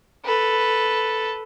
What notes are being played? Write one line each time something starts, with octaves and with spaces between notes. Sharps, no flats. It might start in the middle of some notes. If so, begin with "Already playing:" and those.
A4 B4